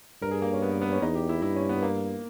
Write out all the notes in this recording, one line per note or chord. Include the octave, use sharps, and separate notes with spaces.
G2 A#4
G#4
A#3
C#4
B3
B3
C#4
E2 D#4
G4
E4
G2 E4
C#4
B3
A#3